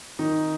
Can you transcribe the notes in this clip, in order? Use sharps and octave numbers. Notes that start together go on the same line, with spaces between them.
D#3 D#4